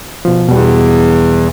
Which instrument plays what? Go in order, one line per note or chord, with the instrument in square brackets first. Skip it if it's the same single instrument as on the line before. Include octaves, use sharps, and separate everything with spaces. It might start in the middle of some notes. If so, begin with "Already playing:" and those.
[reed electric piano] B2 F3
[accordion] E2 [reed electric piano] B2 G3